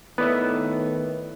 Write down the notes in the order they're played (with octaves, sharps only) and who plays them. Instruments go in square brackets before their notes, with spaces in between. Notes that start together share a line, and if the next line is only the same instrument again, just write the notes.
[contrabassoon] A2 [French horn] D#3 [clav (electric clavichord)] B3 [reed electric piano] B4 D5 E5